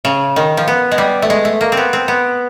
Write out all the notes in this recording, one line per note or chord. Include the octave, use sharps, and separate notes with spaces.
C#3
D#3
F3
B3
G#3
G3
A3
G#3
A3
A#3
C4
B3
C4
B3